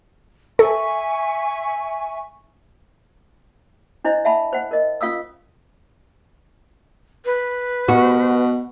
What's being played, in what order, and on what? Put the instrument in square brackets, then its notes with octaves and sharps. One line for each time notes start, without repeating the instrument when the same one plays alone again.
[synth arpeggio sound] A4 [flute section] E5 G#5 C#6
[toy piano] D4 E4 C5 D#5
E5 F#5 A5 B5
C5 F#5
A#4 D#5
C#4 F4 F5 D#6 E6
[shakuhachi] B4
[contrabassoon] B2 [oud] F#4